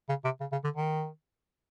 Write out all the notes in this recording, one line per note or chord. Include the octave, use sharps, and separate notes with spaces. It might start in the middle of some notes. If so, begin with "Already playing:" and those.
C#3
C3
C#3
C#3
D3
D#3